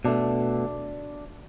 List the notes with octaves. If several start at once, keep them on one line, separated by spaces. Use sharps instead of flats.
B2 A3 D4